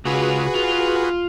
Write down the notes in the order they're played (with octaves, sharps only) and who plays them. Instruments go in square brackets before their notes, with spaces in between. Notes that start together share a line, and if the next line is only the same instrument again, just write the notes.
[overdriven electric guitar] C#3 F4 [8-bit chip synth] F#4 G#4 B4
[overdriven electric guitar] F4